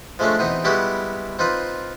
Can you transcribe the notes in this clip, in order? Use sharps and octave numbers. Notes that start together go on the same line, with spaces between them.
F3 G#3 A3 C#4 D4
E2 B2 C4 D#4
G3 G#3 B3 E4 F#4 G4
C4 D#4 F4 B4